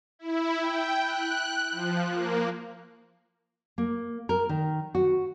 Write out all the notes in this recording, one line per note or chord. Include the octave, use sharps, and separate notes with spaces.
E4
G5
F#6
F3
A#3
A#3
A#4
D#3
F#4